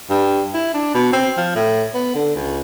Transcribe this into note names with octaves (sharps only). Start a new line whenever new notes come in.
G2
E4
D4
B2
C4
F3
A2
B3
D3
C#2